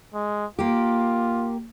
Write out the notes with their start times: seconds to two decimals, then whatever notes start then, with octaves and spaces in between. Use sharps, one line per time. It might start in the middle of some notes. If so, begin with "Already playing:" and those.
0.14 G#3
0.59 A#3 F4 G4